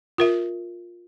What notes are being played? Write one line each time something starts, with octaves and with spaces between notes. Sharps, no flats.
F4 A#4 E5